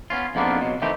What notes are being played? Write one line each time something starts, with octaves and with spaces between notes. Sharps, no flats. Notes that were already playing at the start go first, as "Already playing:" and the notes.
B3 C#4 F4
F2 G#2 A#3 B3 D4 F4
B2 F#3
D#3 E3 A3 C4 G4